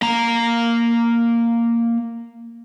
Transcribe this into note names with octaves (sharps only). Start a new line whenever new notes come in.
A#3 A#5